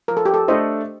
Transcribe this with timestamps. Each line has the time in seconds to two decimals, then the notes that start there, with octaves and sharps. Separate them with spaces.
0.08 F3 A#4
0.17 A4
0.25 G4
0.34 A4
0.48 A3 D4 A4 C5 D#5